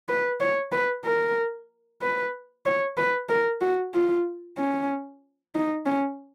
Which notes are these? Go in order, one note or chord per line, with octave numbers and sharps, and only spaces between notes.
B4
C#5
B4
A#4
B4
C#5
B4
A#4
F#4
F4
C#4
D#4
C#4